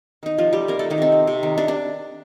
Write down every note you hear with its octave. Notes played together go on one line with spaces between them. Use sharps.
D#3 D#4
C3 F3 F4
G3 A3 G4
C3 A#3 A#4
D#3 A3 A4
D#3 D#4
C3 C4
A3
C3
D#3
C3 D4
D4